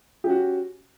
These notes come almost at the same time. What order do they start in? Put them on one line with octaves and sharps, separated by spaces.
G4 C#4 F#4